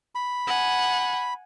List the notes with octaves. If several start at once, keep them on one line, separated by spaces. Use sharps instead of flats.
B5
F#5 G#5